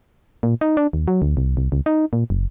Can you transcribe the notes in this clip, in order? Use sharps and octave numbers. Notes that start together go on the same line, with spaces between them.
A#2
D#4
D4
D#2
F#3
D2
C2
C2
C#2
D#4
A#2
F#1